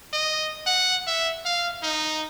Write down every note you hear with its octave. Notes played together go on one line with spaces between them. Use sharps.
D#5
F#5
E5
F5
D#4